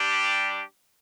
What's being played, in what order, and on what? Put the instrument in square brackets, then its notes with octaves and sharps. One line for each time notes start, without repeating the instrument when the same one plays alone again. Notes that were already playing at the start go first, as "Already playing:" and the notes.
Already playing: [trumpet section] G3 D4 G4